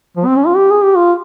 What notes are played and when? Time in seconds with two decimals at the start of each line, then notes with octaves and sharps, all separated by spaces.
0.17 F3
0.26 C4
0.36 C#4
0.47 F4
0.56 G4
0.70 G#4
0.83 G4
0.97 F4